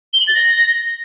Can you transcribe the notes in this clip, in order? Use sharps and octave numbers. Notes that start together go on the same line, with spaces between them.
G7
F#7
A6
A#6